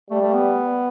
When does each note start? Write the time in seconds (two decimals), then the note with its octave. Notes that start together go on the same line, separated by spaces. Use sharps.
0.11 G3 A3
0.21 A3
0.34 B3